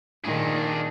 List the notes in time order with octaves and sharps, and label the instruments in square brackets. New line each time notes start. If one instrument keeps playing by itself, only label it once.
[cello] A#2 D#3 [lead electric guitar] D4 G#4